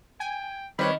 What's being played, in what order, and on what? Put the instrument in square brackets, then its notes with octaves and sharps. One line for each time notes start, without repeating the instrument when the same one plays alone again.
[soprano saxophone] G5 [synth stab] G#5
[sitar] D#3 [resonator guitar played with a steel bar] G3 B4 C#5 [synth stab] C4 [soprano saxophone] B5